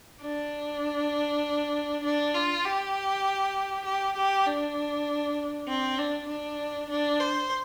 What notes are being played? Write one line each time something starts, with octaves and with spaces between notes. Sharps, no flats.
D4
D4
F4
G4
G4
G4
D4
C4
D4
D4
D4
C5